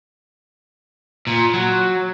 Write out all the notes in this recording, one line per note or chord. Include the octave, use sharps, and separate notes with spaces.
A#2
F#3